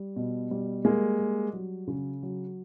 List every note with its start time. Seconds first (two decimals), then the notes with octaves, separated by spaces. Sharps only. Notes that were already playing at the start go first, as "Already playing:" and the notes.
Already playing: G3
0.16 B2
0.51 G3
0.85 G3 G#3 A#3
1.20 G3
1.53 F#3
1.88 C#3
2.23 F#3